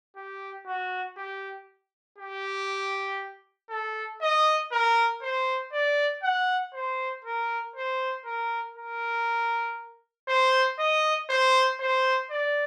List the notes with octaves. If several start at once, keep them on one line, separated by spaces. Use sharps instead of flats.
G4
F#4
G4
G4
A4
D#5
A#4
C5
D5
F#5
C5
A#4
C5
A#4
A#4
C5
D#5
C5
C5
D5